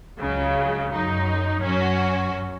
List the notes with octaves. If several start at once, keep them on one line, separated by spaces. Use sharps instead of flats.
C#2 C#3 F#3
F#2 F#3 D#4
F#2 F#3 C#4 F#4